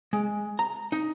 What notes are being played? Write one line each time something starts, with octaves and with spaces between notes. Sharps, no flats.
G#3
A#5
D#4